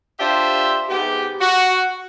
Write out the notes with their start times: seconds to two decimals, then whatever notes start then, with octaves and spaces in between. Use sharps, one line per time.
0.20 D4 F4 G4 C5 E5
0.89 G#2 B3 G4
1.41 F#4